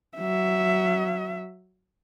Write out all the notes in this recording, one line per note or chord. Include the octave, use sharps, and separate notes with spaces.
F#3 E5